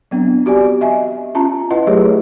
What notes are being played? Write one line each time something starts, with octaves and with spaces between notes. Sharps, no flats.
F#3 B3 C4 D4
F#4 G4 D5 G#5
D#5 E5 G#5
C#4 F4 A5 A#5
E4 F4 B4 D#5 F#5
F#3 A3 G4 G#4 C#5